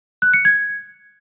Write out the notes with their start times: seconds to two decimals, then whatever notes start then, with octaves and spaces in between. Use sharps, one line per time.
0.22 F#6
0.34 C#7
0.45 G#6